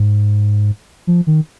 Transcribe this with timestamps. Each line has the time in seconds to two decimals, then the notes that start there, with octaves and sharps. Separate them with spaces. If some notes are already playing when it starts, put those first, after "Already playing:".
Already playing: G#2
1.07 F3
1.27 D#3